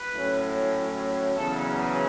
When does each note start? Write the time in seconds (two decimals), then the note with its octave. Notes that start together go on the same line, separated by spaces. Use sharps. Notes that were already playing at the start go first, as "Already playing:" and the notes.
Already playing: B4
0.14 A2 F#3 C#4
1.35 E2 C#3 F#3 A4